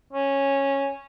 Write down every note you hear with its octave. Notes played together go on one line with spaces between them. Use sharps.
C#4